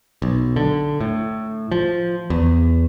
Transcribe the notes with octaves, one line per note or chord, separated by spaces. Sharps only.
B1
D3
A2
F3
E2